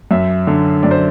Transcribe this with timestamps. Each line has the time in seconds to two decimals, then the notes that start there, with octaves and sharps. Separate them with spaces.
0.11 F#2 E5
0.47 D3
0.83 F#2 D5
0.91 C5